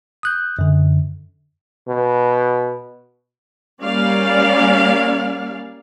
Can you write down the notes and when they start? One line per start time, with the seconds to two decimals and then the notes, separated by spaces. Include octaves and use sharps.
0.23 D#6 F#6 G6
0.59 F#2 D3
1.88 B2
3.82 G3 A#3 C#4 D5 F5